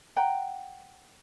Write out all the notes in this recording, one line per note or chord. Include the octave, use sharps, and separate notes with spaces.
F#5 G5 A#5